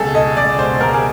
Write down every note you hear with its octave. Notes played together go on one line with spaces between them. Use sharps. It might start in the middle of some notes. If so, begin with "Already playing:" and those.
Already playing: C#2 B2 G#4 A4
G#3 D#5
C#2 D5
B2 C5
C#2 A#4
G#4